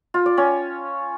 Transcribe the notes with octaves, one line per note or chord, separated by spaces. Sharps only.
F4
D5
C#4